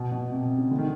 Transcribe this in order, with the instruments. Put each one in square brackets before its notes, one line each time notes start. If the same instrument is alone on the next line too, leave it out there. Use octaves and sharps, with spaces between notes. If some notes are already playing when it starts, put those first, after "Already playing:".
Already playing: [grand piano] B2
B2
C3
C3
C#3
D3
D#3